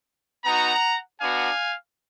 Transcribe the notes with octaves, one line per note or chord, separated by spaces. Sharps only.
B3 D#4 F#4 F#5 A#5
B3 D4 F#4 F5 G#5